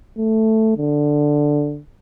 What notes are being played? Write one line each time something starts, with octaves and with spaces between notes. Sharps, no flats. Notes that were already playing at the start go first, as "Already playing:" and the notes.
A3
D3